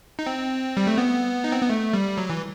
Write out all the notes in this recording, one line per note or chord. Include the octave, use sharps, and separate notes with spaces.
D#4
C4
G3
A3
B3
D#4
C4
B3
A3
G3
F#3
E3